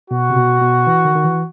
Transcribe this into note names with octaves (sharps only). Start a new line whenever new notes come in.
B2 F#4
C3
B2
B2
E3
D#3
D#3
E3